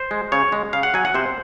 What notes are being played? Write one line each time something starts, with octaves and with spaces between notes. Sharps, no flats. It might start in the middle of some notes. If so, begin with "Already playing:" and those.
Already playing: C5
G#3
C#3 C#5
G#3
C#3 F5
F#5
F#3 G#5
F#5
C3 C5